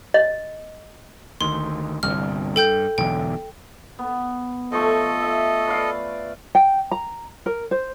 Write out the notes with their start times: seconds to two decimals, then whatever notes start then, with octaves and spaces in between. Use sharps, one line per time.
0.14 D#5
1.41 D2 D#3 C6
2.03 G1 C2 F6
2.56 G2 A4 G5 G6
2.98 B1 E2 D3 G5
3.99 B3
4.72 F3 A3 A4 D#5 C#6
5.22 E5
5.68 B4 D5 F5
6.55 G5
6.91 A#5
7.46 A#4
7.71 C5